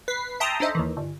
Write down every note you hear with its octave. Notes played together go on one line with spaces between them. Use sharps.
B4 B6 C7
E5 G5 A5 A#5 C6 D#6
D4 D#4 A4 C5 D#5 E5
D#2 D#3 E3
G1